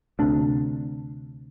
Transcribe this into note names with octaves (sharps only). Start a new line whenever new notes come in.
D2 C3 D4